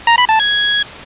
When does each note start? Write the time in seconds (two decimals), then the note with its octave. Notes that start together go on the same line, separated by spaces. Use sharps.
0.07 A#5
0.18 B5
0.29 A5
0.40 G#6